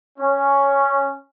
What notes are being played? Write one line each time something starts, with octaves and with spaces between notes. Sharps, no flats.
C#4